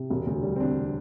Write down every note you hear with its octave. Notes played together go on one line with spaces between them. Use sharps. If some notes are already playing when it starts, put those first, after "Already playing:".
Already playing: C3
E1
D2
G3
C4
D3 D4